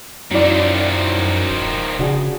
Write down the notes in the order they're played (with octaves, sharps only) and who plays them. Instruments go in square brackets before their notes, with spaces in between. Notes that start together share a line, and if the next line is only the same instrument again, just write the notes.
[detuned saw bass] F#2 [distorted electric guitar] D#3 F3 [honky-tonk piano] F#3 E4 D5
[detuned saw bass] D#1
[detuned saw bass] C#3 [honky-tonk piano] D4 F#4 G#4